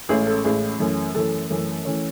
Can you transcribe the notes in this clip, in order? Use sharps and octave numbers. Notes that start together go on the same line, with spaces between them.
A1 A2 G#3 C#4 G#4
A4
A1 A2 G#3 C#4 G#4
F#2 E3 A3 C#4
F#2 E3 A3 C#4 A4
F#2 E3 A3 C#4
E3 A3 C#4